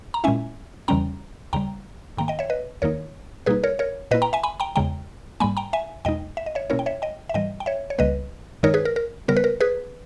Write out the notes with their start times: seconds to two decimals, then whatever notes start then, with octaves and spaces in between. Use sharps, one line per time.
0.14 A#5
0.24 A#2 G#3 C#4 E4 E5 G#5
0.88 E2 C#3 E3 G3 C#4 G5 A#5
1.53 D#2 C#3 G3 G5 A#5
2.17 G#2 D#3 A#3 G5 A#5
2.28 D#5 G5
2.39 C#5 E5
2.50 B4 D#5
2.82 D#2 D#3 A#3 D#4 A#4 C#5
3.46 B2 G3 A#3 D#4 G#4 B4
3.64 A#4 C#5
3.79 A#4 C#5
4.11 A#2 A#3 E4 B4 D#5
4.22 G5 A#5
4.33 E5 G#5
4.43 G#5 B5
4.60 G5 A#5
4.76 E2 C#3 G#3 G5 A#5
5.40 G#2 G3 A#3 G#5 B5
5.57 G5 A#5
5.73 E5 G#5
6.05 E2 B2 G#3 D#4 D#5 G5
6.37 E5
6.46 D#5
6.55 C#5 E5
6.70 B2 A#3 C#4 E4 A#4 C#5
6.79 G5
6.86 C#5 E5
7.02 D#5 G5
7.29 E5
7.34 G#2 E3 G3 D#5 G5
7.60 G5
7.66 C#5 E5
7.90 C#5
7.98 C#2 C#3 G3 A#3 B4 D#5
8.63 G2 D#3 G#3 D#4 A#4 C#5
8.74 G#4 B4
8.85 A#4
8.96 A#4
9.28 C#3 G3 B3 A#4
9.37 B4
9.44 A#4
9.61 G#4 B4